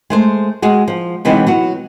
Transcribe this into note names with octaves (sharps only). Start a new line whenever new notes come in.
G#3 A3 C5
G#3 F#4 G#4
F3
C3 E3 F#3 G#3 B3 D#4
F#3 B3 F#4